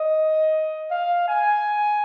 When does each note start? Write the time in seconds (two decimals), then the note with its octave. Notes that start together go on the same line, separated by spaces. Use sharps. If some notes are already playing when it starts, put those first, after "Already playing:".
Already playing: D#5
0.91 F5
1.28 G#5